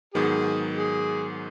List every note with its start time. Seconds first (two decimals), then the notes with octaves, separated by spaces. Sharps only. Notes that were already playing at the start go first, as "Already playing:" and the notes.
0.14 G#2 D#3 F#3 B3 G#4
0.76 G#4